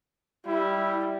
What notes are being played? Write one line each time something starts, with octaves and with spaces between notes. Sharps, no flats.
G3 E4